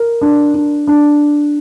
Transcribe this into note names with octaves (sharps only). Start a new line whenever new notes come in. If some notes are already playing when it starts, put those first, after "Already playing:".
Already playing: A#4
D4
D4
D4